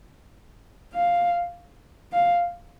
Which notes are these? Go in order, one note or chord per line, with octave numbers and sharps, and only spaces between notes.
F5
F5